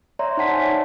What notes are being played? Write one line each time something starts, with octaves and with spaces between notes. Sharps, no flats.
C#5 D5 E5 A#5 C6
D#4 C5 D5 F#5 A5 B6
C#5 G#5